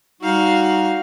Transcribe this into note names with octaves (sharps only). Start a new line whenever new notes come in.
G3 D#4 F#4 F5